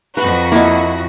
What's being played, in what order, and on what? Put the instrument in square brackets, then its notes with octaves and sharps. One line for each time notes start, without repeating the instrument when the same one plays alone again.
[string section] F2 F#4 [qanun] B4 B5
[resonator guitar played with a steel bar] A#3 D#5 [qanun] E4 A5 C#6